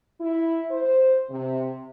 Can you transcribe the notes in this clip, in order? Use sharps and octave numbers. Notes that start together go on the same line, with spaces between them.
E4
C5
C3